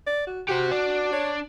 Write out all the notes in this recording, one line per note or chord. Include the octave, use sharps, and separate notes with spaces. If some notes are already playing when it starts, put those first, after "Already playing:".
D5
F#4
F#4 G4 C5
D4
C#5